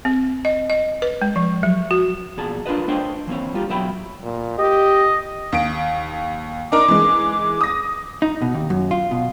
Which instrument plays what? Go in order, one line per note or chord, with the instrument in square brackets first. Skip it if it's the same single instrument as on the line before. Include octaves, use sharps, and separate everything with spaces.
[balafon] C4
D#5
D#5
B4
G#3
F3
F#3
F#4
[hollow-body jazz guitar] E2 A#2 G#4 A5
D4 F4 A#4 B4 D#5
A3 D4 C5 C#5 D#5 G5
E3 A#3 C4 C#5
G3 F4 G4
B2 F#3 C#5 E5 G5 B5
[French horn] A#2
[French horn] G4 [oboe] D#5
[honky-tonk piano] D#2 D7
[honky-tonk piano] D4 D#4 A#4 [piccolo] D6
[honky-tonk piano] E3 G#3
D#6 A#6
[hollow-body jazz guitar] D#4
B2
D#2
F#2
F4
B2